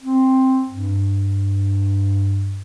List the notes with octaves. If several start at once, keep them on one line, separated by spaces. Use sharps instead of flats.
C4
G2